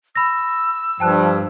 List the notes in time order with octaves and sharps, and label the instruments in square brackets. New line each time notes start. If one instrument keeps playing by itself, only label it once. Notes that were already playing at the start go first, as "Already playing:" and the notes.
[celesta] B5 A#6 [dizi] E6
[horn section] G2 [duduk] F3 [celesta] G5 A5 F#6